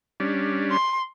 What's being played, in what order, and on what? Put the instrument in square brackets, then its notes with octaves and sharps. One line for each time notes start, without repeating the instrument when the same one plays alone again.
[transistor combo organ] G3 C#4 D4
[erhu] C6